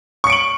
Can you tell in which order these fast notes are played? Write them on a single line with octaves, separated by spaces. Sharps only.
C#6 C#7 D7 F#7